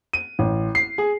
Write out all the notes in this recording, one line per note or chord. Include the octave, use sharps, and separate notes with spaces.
D#7
A1
C7
G#4